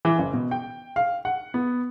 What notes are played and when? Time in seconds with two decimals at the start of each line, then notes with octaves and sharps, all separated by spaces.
0.05 E3
0.18 F#1
0.33 B2
0.51 G5
0.96 F5
1.25 F#5
1.54 B3